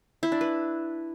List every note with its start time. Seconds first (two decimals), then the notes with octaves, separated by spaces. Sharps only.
0.23 E4
0.32 D4
0.41 B4